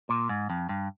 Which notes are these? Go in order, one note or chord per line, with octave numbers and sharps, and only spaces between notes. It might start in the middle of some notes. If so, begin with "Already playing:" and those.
A#2
G#2
F2
G2